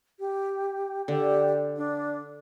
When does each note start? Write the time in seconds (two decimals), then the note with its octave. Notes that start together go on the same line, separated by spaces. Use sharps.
0.19 G4
1.08 D3 G4
1.77 D4